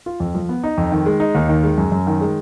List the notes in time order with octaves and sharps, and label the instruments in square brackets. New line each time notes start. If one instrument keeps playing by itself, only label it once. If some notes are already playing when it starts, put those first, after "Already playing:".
[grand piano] F4
F2
F3
B3
D#4
F2
D#3
G#3
D#4
D#2
D#3
G#3
F#2
F#2
D#3
G#3